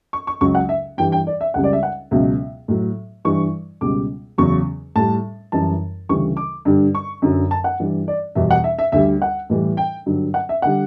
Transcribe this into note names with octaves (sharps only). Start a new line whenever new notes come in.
C#6
C#6
C#2 C#3 F#3 C#6
F#5
E5
G2 E3 G3 G5
G5
D5
E5
C#2 C#3 G3 F#5
D5
E5
F#5
C#2 B2 F#3 E5
A2 F#3
G2 E3 G3 C#6
C#2 B2 G3 D6
E2 C#3 F#3 C#6
A2 G3 A5
F#2 E3 G3 A5
D2 C#3 E3 G3 C#6
D6
G2 D3 G3
C#6
F#2 D3 F#3
A5
F#5
G2 E3 G3
D5
E2 B2 G3 E5
F#5
E5
E5
D2 D3 G3 E5
F#5
A2 E3 G3
G5
G2 D3 F#3
F#5
E5
D3 G3 F#5